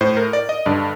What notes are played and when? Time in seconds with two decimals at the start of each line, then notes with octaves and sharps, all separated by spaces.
0.01 A2 C5
0.17 A#4
0.33 D5
0.49 D#5
0.66 G2 D3 D5